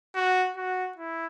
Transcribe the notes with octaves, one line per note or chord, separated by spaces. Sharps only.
F#4
F#4
E4